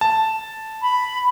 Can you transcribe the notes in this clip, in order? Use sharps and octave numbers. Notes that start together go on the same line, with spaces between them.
A5
B5